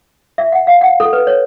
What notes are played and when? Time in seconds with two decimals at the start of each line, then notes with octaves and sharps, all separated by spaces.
0.38 E5
0.52 F#5
0.67 F5
0.81 F#5
1.00 A4
1.13 B4
1.27 C#5